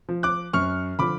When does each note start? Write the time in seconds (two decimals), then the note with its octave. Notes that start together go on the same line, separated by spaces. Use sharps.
0.09 F3
0.23 D6 F#6
0.53 F#2 C#6 F6
0.99 D3 F3 B5 D6